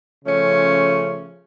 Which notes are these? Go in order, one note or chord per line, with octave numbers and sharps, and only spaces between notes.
C#3 F3 A3 C#4